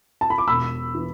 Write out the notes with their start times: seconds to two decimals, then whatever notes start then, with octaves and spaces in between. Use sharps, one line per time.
0.21 A5
0.30 B5
0.38 D6
0.48 E1 B5 E6
0.95 E3